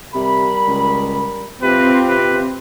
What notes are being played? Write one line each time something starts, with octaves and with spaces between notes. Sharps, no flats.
C3 G3 A#4 B5
C#2
C3 C4 F4 G4 B4
C3 B4